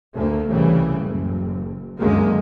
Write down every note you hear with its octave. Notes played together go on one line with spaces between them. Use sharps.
D2 A3 A#3
C2 A2 C#3 E3 G3
F#1
C#2 F#2 D3 D#3 G#3 A#3